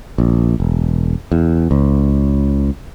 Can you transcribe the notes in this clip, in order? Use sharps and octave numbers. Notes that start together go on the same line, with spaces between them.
A#1
E1
E2
C#2